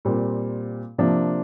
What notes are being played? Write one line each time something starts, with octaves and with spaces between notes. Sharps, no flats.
A#2 G3 C4
C3 F3 A#3 D4